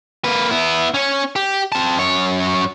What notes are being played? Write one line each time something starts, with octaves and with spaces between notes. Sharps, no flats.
A#3 B4
B3 E4
C#4 C#5
G4
C4 A5
F#2 C#5